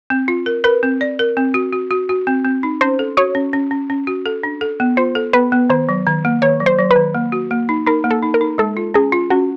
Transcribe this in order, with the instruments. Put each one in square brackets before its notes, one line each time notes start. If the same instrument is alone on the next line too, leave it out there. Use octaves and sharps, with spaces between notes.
[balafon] C4
F4
A#4
[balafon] A#4 [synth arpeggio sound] B4
[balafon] C4
D5
A#4
C4
F#4
F#4
F#4
F#4
C4
C4
D#4
[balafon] C#4 [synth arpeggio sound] C5
[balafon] A4
[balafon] F#4 [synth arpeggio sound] C#5
[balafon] C#4
C#4
C#4
C#4
F#4
A4
D4
A4
B3
[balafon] F4 [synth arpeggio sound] C5
[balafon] A4
[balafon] B3 [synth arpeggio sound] B4
[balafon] B3
[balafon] D#3 [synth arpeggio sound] C5
[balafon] F#3
D#3
A#3
[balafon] D#3 [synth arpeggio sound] C#5
[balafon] F#3
[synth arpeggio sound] C5
[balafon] F#3
[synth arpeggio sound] B4
[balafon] D#3
A#3
F#4
A#3
D#4
[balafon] D#4 [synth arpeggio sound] A#4
[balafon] A#3
[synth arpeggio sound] A4
[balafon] D#4
[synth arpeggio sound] A#4
[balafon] D#4
[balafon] G#3 [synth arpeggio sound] A4
[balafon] F4
[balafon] C#4 [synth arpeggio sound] G#4
[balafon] F4
[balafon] C#4 [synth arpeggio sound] F#4